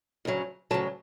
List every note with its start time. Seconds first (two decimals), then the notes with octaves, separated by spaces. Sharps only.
0.25 D2 C#3 F#3
0.71 D2 C#3 F#3 A5